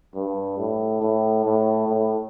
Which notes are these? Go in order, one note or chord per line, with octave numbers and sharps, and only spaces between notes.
G2
A2
A2
A2
A2